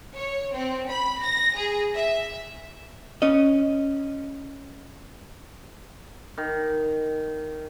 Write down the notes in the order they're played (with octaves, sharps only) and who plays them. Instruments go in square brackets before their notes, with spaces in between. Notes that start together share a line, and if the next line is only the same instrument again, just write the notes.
[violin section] C#5
C4
B5
A#6
G#4
E5
[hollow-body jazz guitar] C#4 D#5
[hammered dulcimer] D#3